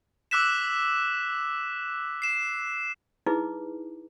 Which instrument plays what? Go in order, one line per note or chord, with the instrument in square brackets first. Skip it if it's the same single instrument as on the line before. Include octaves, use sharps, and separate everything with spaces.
[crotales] D6 E6 F#6 B6 E7
C7 E7
[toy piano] D#4 E4 G#4 B4 D6